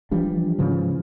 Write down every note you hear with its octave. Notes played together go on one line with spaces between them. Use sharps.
E3 F3 G3 D4
G#2 C#3 E3 F3